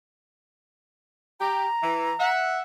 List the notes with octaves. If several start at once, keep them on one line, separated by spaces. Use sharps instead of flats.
G4 A#5
E3
E5 F#5